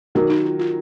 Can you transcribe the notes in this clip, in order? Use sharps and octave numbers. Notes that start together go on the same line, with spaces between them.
D#3 F#3 A#4
D#4
F4
F4